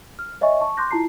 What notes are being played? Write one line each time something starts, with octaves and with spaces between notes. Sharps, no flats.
F6
C#5 D#5 E5 G#5 C#6
A5 C#6
C6 D6 F#6 G6 A#6
E4 F4 A5 A#5 C7